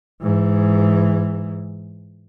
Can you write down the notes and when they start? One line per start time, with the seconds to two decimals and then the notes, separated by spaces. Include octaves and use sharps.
0.22 G#2 E3